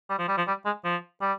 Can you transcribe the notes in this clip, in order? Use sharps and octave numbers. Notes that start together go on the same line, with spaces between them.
G3
F3
G3
F3
G3
G#3
F3
G3